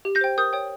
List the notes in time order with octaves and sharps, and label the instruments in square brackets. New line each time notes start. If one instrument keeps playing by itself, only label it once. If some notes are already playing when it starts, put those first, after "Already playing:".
[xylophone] G4
G6 A#6
C5 G5
A#4 D#6 G6
C#5 G5